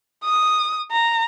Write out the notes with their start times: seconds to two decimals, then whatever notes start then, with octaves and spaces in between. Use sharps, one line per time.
0.24 D#6
0.92 A#5